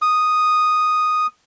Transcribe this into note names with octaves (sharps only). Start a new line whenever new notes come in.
D#6